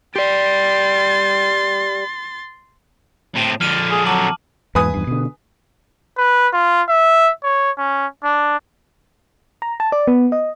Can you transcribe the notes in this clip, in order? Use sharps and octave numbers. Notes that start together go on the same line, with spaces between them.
G4 D5 C6 A6
A2 C4
F2 D3 F6 D#7
G#4
F#3 A5 D6 F#7
E2 G#2 B4 G#5 D#6
E2 G2
B2 D3
B4
F4
E5
C#5
C#4
D4
A#5
A5
D5
B3
D#5